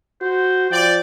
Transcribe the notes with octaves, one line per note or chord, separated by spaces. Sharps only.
F#4 C5
F3 D5 G5